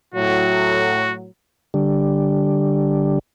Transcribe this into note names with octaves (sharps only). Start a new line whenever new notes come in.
A2 F#3 F#4
D3 G3